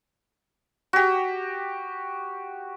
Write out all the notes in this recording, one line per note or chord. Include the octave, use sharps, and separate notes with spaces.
F#4 G4